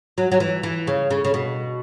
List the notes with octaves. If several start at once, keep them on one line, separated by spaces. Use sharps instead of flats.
F#3
F#3
E3
E3
C#3
C#3
C#3
B2